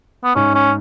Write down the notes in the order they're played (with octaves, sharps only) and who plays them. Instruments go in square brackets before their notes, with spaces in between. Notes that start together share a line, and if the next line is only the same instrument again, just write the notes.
[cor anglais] B3
[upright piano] G#2 [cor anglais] C#4
[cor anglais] C#4